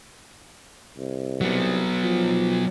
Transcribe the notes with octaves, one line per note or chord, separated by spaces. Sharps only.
C2
F#3 B3
F3